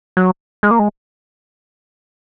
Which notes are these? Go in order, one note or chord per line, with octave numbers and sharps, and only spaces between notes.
F#3
G#3
A#3
G#3